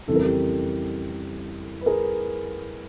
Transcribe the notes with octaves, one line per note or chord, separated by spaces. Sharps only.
F2 C#3 E3 G3 A4
A#4
G4 A4
B4
G#4 A#4